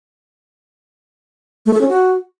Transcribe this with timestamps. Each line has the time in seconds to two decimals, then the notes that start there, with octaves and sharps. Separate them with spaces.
1.66 A3
1.74 A4
1.81 C#4
1.89 F#4